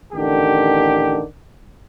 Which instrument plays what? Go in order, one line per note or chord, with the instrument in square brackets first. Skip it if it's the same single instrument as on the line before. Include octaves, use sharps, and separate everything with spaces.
[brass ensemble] A1 D3 D#3 G4